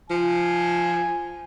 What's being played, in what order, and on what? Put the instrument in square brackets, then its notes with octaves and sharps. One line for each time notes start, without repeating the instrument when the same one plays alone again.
[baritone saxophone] F3 [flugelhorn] G#5